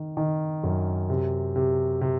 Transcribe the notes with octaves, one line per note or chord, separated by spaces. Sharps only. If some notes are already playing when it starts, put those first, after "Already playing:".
Already playing: D#3
D#3
F#2
C3
C3
C3